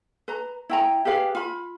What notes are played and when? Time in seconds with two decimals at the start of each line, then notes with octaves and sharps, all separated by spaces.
0.28 B4 A#5
0.69 E4 G5 A#5
1.05 G4 G#4 B4 F5
1.35 F4 B5